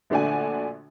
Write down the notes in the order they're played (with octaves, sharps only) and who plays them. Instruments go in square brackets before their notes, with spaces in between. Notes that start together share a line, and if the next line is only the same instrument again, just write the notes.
[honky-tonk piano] A#1 D3 A3 D4 F#4 G#5